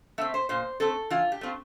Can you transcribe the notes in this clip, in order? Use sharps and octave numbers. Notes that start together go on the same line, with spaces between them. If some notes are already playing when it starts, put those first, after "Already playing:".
A3 C4 E5
C5
A#2 C5
A3 C4 A4
E3 F4
G4
A3 C4 F4